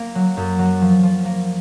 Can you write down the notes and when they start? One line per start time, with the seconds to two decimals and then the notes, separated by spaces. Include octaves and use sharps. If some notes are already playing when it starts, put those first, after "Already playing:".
Already playing: A#3
0.15 F#3
0.37 F#2
0.59 F#3
0.82 F3
1.03 F3
1.25 A#3